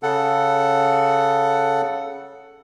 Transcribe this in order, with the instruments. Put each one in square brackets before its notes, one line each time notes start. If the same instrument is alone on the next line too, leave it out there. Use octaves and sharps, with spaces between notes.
[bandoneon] C#3 A4 F#5